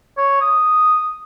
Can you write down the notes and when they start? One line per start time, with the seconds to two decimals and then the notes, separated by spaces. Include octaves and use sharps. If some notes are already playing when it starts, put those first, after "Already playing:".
0.17 C#5
0.41 D#6